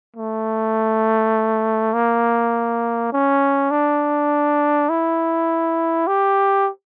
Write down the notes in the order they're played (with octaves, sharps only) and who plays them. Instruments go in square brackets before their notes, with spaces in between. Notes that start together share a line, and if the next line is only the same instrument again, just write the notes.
[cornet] A3
A#3
C#4
D4
E4
G4